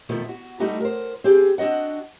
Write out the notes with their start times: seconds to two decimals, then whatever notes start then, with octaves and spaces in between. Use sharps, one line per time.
0.09 F2 B2 D#3 F3 A3 E4
0.29 F#4
0.60 G3 A3 D#4 E4 F#4 G4
0.81 A#4 C5
1.24 C4 G4 G#4
1.58 C4 D4 F#4 D#5 F#5